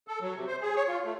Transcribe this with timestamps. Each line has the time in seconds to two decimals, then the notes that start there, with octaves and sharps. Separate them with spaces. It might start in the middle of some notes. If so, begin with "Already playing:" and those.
0.08 A4
0.22 F#3
0.36 C3
0.47 C5
0.61 G#4
0.76 C#5
0.88 F4
1.04 A3